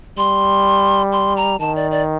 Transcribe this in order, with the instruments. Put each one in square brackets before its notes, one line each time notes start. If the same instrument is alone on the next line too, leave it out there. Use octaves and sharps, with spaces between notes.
[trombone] G3 [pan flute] C6
[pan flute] C6
A#5
[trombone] D#3 [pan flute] A5
[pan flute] D5
D5